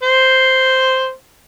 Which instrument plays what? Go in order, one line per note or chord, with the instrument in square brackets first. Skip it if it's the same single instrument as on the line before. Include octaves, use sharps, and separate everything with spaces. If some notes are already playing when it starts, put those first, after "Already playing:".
[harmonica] C5